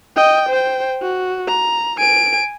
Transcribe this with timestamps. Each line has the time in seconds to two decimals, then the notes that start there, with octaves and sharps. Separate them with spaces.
0.16 D#5 G5
0.49 C5 G5
1.02 F#4
1.48 A#5
1.98 G#5 D7